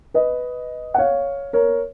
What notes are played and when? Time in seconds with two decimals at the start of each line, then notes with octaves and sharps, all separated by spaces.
0.14 B4 D#5
0.94 F#5
0.98 C#5 F5
1.53 A#4 C#5